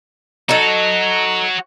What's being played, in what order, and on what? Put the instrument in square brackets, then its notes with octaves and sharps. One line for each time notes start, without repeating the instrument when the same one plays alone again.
[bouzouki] D#4 A4 [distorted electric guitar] F#4 C#5